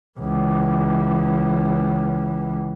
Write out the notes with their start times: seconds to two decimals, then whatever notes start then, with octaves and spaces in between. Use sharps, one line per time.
0.19 C#2 E3